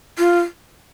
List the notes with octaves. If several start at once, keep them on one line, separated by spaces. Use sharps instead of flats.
F4